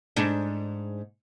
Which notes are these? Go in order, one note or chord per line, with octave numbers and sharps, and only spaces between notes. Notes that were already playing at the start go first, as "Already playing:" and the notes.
G#2 D4